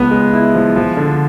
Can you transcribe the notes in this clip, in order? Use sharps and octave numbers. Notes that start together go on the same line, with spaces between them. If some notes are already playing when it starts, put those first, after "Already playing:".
Already playing: C#2 B3
G#3
E4
F3
F3
D3